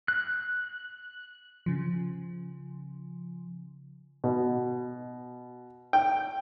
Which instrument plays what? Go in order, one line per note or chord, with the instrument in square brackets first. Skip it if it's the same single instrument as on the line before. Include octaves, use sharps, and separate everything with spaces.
[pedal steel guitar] F#6
[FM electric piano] C#3 F3
[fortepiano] B2
G5